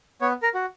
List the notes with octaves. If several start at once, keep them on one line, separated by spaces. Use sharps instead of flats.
B3 C#5
A#4
F#4